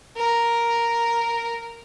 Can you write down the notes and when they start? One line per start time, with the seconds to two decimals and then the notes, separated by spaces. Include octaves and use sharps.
0.17 A#4